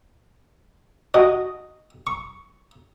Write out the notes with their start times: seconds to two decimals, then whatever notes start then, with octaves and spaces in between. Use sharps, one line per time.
1.14 F#4 D#5
2.07 C#6